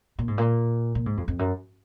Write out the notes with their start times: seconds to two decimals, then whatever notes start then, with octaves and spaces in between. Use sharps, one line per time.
0.19 A#2
0.28 G#2
0.38 A#2
0.95 A#2
1.06 G#2
1.17 F2
1.28 F2
1.39 F#2